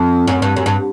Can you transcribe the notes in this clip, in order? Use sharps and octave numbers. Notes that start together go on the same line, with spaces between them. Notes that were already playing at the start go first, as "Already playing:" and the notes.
Already playing: F2
F#2
G2
F#2
G2